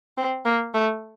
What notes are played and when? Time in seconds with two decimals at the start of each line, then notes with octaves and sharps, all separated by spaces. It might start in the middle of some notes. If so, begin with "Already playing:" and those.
0.17 C4
0.45 A#3
0.74 A3